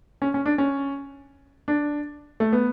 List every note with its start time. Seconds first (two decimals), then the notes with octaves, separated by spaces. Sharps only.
0.22 C#4
0.34 C#4
0.46 D4
0.58 C#4
1.68 D4
2.40 A3
2.53 B3